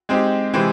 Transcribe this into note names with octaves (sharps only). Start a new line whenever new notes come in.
G#3 C4 D#4 G4
C3 E3 G#3 C4